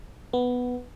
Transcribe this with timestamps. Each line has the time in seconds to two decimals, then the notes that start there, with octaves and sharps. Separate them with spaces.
0.33 B3